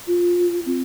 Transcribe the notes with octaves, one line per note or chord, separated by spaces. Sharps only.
F4
C4